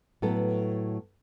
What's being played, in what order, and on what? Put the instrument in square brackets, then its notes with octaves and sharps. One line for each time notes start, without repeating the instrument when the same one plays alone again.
[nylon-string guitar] A2 F#3 B3 A4